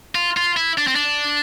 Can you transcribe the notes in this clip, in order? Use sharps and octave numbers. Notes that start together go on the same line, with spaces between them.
F4
F4
E4
D4
C4
D4